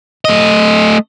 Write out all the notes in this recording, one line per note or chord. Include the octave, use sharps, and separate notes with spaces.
A3 D#5